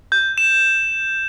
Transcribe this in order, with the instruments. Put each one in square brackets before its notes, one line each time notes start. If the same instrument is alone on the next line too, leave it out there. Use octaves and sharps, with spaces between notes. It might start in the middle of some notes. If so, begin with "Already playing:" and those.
[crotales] G6
E7